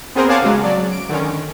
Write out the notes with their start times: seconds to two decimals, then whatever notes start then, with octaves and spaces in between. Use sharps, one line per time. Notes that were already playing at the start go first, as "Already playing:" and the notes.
0.15 B3 C4 G#4 A#4 C5
0.29 C#5 F5 F#5 G#5 A5 D6
0.42 C#3 F#3 G#3
0.64 F#3 D5
0.91 D7
1.09 D3 D#3 C#4